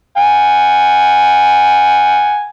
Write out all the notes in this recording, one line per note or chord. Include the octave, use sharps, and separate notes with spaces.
F#5 G#5